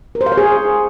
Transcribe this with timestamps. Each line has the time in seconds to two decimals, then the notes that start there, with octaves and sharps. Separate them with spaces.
0.15 A#4
0.21 C5
0.26 F5
0.32 C#5
0.37 G#4